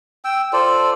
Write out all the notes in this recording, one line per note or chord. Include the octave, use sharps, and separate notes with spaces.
G5 E6
F4 A4 C5 D5